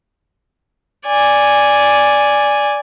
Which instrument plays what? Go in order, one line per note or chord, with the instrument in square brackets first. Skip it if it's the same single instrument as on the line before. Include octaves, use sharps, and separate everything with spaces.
[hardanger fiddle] D5 G#5